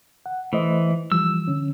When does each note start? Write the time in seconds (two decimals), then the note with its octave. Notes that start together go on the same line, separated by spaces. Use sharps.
0.26 F#5
0.53 E3 A3 C5 D#5
1.12 E3 F3 G3 E6
1.48 D3 C#4